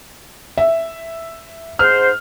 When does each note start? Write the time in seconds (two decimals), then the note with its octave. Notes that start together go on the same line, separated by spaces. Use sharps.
0.58 E5
1.79 G#2 C5 F6